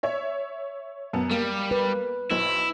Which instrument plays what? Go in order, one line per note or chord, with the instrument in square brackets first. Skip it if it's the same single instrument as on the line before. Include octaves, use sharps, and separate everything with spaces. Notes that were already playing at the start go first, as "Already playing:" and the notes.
[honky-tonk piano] C#5 E5
F#2 B3 A5
[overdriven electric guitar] G3 [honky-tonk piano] A#3
[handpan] B4
[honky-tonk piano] B1 C5 [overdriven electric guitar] E4